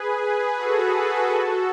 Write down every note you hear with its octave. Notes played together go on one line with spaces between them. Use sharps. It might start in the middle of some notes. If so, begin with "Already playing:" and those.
Already playing: G#4 B4
F#4 A4
G#4 B4
F#4 A4